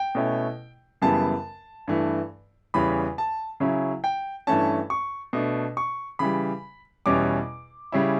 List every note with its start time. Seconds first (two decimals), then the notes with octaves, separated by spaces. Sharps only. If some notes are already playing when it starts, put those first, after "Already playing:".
Already playing: G5
0.15 B2 A3 C#4 E4
1.02 F#2 C#3 E3 G3 B3 A5
1.88 G2 E3 A3
2.74 E2 C#3 E3 G3 C#4 B5
3.18 A5
3.60 C#3 F#3 C#4 E4
4.04 G5
4.47 G2 E3 A3 C#4 A5
4.90 C#6
5.33 B2 A3 D4
5.77 C#6
6.19 C#3 E3 G3 B5
7.06 E2 B2 G3 C#4 E4 D6
7.92 C#3 G3 C#4 E4